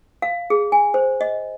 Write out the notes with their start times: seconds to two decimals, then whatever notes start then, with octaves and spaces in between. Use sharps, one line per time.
0.22 F5
0.50 G#4
0.72 G#5
0.94 C5
1.21 D#5